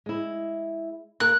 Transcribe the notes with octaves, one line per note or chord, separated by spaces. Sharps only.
G#3 E4
A#3 A#4 F#6